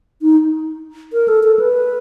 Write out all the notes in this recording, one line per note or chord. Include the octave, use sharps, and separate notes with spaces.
D#4
A#4
A4
A4
B4